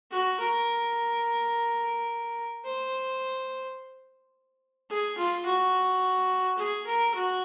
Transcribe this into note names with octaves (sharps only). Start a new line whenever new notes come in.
F#4
A#4
C5
G#4
F4
F#4
G#4
A#4
F#4